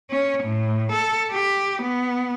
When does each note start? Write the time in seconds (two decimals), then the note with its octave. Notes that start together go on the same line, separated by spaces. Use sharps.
0.10 C#4
0.44 A2
0.92 A4
1.32 G4
1.82 B3